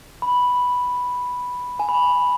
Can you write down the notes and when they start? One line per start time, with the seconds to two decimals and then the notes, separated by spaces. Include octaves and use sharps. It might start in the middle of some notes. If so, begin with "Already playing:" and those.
0.22 B5
1.79 G#5
1.89 B5